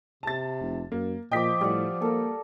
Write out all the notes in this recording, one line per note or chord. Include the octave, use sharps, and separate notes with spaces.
C3 A5 A6
F1
F#2 A#3
A#2 F3 D#5 G5 D6 B6
A2 G3 D5 F#5
A#3 A4 A#4